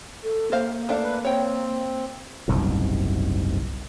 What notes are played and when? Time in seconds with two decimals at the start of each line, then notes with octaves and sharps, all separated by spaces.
0.23 A4
0.52 A#3 C5 F5
0.89 A3 D4 F5
1.03 B4
1.25 C4 C#5 G5
2.48 F#1 C2 G#2 B2